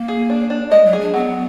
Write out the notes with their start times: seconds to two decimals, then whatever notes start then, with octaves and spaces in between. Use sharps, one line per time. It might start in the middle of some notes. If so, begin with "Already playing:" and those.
Already playing: A#3
0.08 G#4
0.30 D4
0.50 D4
0.71 G#3 D#5
0.86 F#3
0.93 G#4
1.01 D4
1.14 F#3 B3